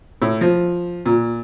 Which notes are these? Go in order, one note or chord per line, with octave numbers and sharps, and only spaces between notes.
A2
F3
A#2